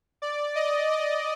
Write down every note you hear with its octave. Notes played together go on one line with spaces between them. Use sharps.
D5
D#5
D#5